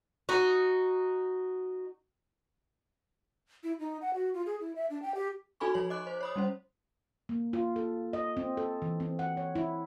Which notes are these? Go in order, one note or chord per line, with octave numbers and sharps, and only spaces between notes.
D#4 F#4
E4
D#4
F#5
F#4
F4
G#4
E4
E5
D4
G5
G4
D#4 F#4 A4 G#5 B5 C#6
F3 C#5 F#7
D#5 D6 F#6
C5
C#5 B5 D#6
G3 C#4 C5
A#3
F4
A4
D#5
C4
A4
E3
C4
F#5
C#5
E4